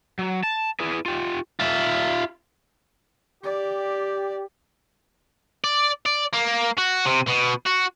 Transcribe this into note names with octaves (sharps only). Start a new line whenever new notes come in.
F#3
A5
E4 G#4 B4
F4 G4
F4 E5
G4 D5
D5
D5
A#3
F#4
C3
B2
F#4